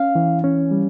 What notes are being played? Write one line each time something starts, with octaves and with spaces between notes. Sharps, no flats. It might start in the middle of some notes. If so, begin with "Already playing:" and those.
Already playing: C#4 F5
E3
C#4
G3